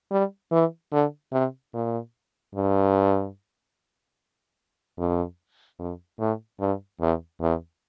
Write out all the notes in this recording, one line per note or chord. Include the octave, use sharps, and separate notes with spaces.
G3
E3
D3
C3
A#2
G2
F2
F2
A2
G2
E2
E2